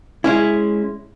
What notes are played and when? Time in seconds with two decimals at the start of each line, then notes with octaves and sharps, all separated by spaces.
0.24 G#3 C#4 E4